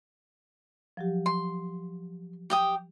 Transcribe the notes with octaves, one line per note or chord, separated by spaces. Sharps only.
F3 F#3 G4
C6
G4 G5 D#6